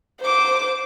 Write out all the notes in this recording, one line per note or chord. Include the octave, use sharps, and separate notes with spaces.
C5 D6